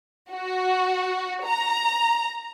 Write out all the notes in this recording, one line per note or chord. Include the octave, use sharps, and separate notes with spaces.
F#4
A#5